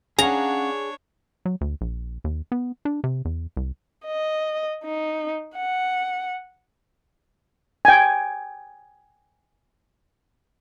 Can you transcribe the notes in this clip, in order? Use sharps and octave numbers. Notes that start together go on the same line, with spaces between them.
C#4 D4 G#4 C#5 F5 F#5 A#5
F#3
D2
A#1
D#2
B3
D4
C3
E2
C2
D#5
D#4
F#5
G5 G#5